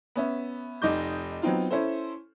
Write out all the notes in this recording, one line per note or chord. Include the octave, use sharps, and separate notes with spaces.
B3 C#4 E5
F1 D#4 D#5 D6 G6
F#3 B3 C4 D#4 F4
C#4 E4 A4 C5